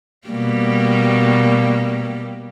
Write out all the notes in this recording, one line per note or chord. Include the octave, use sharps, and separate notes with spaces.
B2 G3 A#3